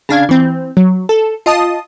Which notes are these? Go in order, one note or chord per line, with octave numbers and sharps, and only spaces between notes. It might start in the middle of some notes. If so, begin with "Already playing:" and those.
C#3 D4 F5 G#6
E3 C4
F#3
A4
F4 D#5 A5 D#6